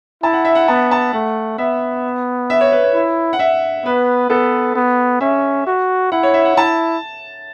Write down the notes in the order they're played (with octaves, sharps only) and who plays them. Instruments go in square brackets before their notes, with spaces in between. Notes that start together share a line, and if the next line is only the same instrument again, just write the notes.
[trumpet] E4 [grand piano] A5
[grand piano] F#5
E5
F#5
[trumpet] B3 [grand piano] A5
[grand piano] A5
[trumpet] A3 [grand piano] F#5
[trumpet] B3 [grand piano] E5
[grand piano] E5
C#5
B4
C#5
[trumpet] E4
[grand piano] F#5
E5
[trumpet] B3 [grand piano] B4
[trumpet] B3 [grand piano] A4
[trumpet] B3
[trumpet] C#4 [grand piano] E5
[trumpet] F#4
[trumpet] E4 [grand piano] F#5
[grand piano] C#5
E5
F#5
[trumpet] E4 [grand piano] A5